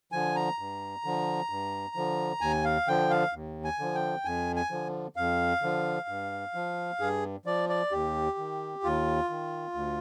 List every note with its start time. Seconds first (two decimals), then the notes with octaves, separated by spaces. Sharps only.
0.12 D3 F3 G#5
0.36 A#5
0.58 G2
1.04 D3 F3
1.50 G2
1.96 D3 F3
2.41 D#2 G#5
2.65 F5
2.88 D3 F3 G5
3.10 F5
3.33 D#2
3.64 G#5
3.79 D3 F3
3.95 G5
4.25 F2 G#5
4.56 G#5
4.71 D3 F3
5.16 F2 F5
5.62 D3 F3
6.08 G2
6.55 F3
7.00 G2 G#4
7.46 F3 D5
7.69 D5
7.91 D#2 G4
8.38 D#3
8.83 D#2 F4
9.30 D#3
9.74 D2